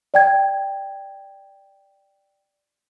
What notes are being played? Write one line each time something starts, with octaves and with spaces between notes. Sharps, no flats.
D5 G5 G#6